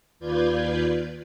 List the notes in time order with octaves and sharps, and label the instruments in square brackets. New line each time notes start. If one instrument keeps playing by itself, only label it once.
[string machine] D#2 F4 B4 D5 G6 G#6